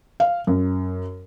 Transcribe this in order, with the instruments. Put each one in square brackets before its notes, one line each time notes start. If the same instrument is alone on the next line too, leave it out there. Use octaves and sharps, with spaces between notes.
[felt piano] F5
F#2